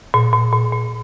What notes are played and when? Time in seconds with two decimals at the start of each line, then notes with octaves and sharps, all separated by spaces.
0.14 A#2
0.33 A#2
0.53 A#2
0.72 A#2